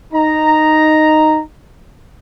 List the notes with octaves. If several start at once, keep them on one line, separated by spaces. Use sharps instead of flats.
D#4 A#5